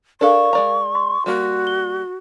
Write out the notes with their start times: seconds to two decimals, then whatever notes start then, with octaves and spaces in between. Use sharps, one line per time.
0.21 D4 A4 A#4 F5 C#6
0.53 G#3 D5 A#5
0.95 C6
1.26 G3 A#3 F#4
1.67 G7